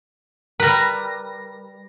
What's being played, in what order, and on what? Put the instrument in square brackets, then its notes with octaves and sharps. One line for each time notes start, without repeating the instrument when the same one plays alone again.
[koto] G3 B4 [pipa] A#4 [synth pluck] A#6